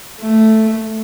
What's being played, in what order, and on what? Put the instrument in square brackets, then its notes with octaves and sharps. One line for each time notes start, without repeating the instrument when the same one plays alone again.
[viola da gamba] A3